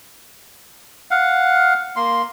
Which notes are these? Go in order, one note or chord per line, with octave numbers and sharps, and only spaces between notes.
F5 F#5
A#3 C6